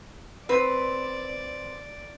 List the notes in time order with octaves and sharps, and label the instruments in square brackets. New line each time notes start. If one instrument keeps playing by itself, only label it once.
[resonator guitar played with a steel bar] C4 B4 [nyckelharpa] D5